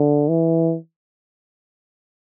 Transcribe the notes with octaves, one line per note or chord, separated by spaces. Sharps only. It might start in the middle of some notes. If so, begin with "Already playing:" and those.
Already playing: D3
E3